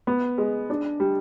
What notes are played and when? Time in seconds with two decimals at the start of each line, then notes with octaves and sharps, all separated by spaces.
0.07 B3
0.38 G#3
0.70 D4
1.00 G3